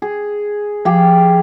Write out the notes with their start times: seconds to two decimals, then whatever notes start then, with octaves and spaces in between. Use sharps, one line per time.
0.02 G#4
0.85 F3 G4 G#4